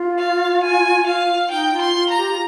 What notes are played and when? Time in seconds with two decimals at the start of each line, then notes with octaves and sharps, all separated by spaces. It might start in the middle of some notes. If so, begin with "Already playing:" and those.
Already playing: F4
0.18 F5
0.62 G#5
1.06 F5
1.51 D#4 G5
1.73 F4
1.80 C6
1.96 F4
2.10 A#5
2.17 G4
2.31 F4